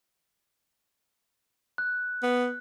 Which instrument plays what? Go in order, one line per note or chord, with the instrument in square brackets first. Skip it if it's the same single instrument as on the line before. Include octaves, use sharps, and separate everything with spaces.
[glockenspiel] F#6
[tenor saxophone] B3